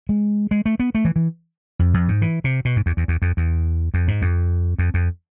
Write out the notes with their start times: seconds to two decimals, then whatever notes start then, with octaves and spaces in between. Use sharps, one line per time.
0.09 G#3
0.51 G#3
0.66 A3
0.80 B3
0.95 A3
1.05 E3
1.16 E3
1.79 F2
1.94 F2
2.08 G#2
2.22 E3
2.44 C3
2.65 B2
2.76 G#2
2.86 E2
2.97 E2
3.08 E2
3.22 F2
3.37 E2
3.94 F2
4.08 G#2
4.22 F2
4.79 F2
4.94 F2